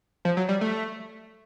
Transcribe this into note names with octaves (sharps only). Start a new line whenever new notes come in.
F3
F#3
G3
A3